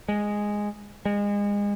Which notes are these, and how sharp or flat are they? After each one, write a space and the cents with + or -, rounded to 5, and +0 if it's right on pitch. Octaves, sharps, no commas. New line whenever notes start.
G#3 -5
G#3 -30